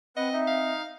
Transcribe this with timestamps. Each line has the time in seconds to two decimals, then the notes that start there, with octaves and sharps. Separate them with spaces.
0.16 C4 B4 D#5 F#5
0.33 D#4 E5
0.47 F5